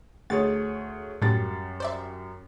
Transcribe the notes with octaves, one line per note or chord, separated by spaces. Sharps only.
D2 G#4 C#5 A6
F#2 A2 G3 A6
C5 D5 E5